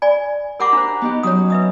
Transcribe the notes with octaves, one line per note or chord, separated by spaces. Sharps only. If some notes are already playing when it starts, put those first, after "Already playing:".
D5 G#5
G4 A#4 F#5 A#5 B5 D6
D4 C5
B3 D#4 G4
F#3 C#4 C#5 D#6
B4 E5 D#6